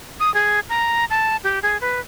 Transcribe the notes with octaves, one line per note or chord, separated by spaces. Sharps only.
D#6
G#4
A#5
A5
G4
G#4
B4